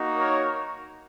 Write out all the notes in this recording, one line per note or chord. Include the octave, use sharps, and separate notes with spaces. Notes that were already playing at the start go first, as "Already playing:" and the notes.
Already playing: A#3 D#4 F#4
A#4 C#5